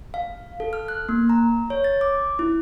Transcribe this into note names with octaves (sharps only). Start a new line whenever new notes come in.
F5
A4
F6
F#6
A#3
A#5
C#5
A6
D6
E4